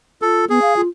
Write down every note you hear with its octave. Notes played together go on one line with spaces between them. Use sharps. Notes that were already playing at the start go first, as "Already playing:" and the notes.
F4 A4
B3 G#4
F5
F4